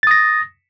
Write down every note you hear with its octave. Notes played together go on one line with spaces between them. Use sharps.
D#6 A6 A#6